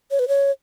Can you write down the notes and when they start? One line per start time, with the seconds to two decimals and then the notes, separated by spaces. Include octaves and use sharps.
0.11 C#5
0.19 B4
0.28 C#5